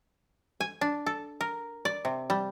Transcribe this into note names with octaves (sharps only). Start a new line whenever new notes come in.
G#5
D4
A4
A#4
D5
C3
G3